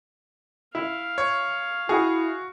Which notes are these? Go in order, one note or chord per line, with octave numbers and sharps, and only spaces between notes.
E4 F5
C#5
E4 F#4 G#4